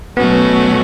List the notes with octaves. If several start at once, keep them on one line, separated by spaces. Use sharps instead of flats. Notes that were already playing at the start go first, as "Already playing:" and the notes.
B2 F#3 A3 B3 C#4 F#4